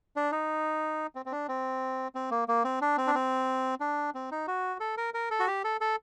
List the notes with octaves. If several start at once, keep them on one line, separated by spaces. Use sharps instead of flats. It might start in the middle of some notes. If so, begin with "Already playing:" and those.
D4
D#4
C4
C4
D4
C4
C4
A#3
A#3
C4
D4
C4
D4
C4
D4
C4
D#4
F#4
A4
A#4
A#4
A4
F#4
G4
A4
A4